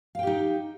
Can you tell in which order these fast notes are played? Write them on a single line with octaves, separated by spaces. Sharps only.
F5 G5 G4 D#4